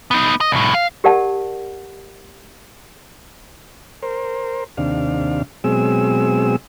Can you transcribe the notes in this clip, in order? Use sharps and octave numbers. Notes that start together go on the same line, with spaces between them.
B3 D#4
D#5
C2 A2
F5
G4 A#4 D5 F#5 A5
A#4 C5
D#2 C3 D4 F5
B2 F#3 G#3 C4 G#4 E6